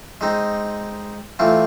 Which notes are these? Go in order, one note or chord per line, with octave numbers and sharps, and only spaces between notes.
G#3 C4 D#4
E3 A3 C4 F4